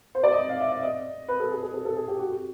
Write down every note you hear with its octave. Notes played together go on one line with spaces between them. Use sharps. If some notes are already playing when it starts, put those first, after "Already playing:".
C5
D5
D#5
F5
E5
E5
D#5
B4
A4
G#4
G#4
A4
A4
G#4
G4
F#4
F#4